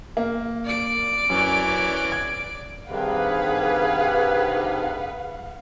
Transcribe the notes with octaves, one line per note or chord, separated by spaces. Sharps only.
A#3
D5 D7
F#2 E3 C#4
G#6
G2 C3 D#3 G#4 B4 F5 F#5